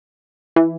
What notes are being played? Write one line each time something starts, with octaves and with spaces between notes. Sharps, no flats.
E3